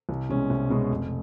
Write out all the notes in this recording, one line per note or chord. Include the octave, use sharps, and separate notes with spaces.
C2
B2 G#3 C#4
C2
B2 G#3 C#4
F1